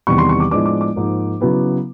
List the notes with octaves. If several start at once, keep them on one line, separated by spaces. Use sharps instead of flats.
E2 C3 D#3 G3 C#6
C6
C#6
D6
A2 F3 G#3 B3 D4 D6
D6
D6
G#2 F3 A#3
C#3 F#3 B3 E4